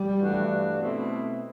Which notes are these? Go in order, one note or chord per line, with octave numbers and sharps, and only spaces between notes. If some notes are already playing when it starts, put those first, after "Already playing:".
Already playing: G3
G2 E3 A3 D4 F#4
B2 A3 C4 E4